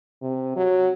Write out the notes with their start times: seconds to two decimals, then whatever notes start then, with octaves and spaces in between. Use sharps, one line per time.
0.22 C3
0.56 F#3